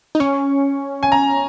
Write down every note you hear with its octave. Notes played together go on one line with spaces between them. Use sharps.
D#4
C#4 C#6
G#5
A#5